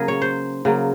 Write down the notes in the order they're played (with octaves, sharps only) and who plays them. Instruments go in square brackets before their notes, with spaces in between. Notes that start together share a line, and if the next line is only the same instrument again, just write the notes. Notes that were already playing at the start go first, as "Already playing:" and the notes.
Already playing: [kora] C#3 F#3 A#3 G#4 A#4
C#5
C5
C#3 F#3 A#3